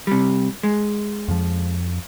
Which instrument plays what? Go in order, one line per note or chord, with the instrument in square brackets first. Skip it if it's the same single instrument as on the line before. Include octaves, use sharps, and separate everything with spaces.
[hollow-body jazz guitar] C3 G3
G#3
[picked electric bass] F2 F3